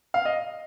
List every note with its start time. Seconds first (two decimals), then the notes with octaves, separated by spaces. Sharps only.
0.14 F5
0.25 D#5